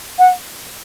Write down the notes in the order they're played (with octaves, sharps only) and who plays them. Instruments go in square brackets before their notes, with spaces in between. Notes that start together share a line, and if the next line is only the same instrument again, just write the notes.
[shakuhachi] F#5